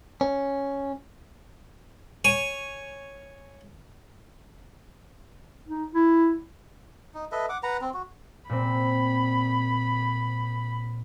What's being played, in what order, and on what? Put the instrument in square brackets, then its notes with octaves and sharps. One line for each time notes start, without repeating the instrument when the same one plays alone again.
[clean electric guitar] C#4
[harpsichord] C#5 G#5
[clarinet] D#4
E4
[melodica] D#4
A4 B4 D#5 E5
F#5 D6
B4 F#5 A#5
C4
F#4
[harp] A#2 C4 [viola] B5